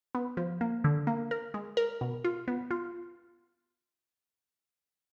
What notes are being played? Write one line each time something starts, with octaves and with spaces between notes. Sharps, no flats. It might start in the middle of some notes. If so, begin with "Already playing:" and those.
B3
F3
A#3
D3
A#3
A#4
G#3
A#4
B2
F4
B3
F4